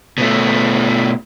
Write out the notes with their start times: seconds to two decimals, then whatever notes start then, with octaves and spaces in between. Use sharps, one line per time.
0.18 B2 A3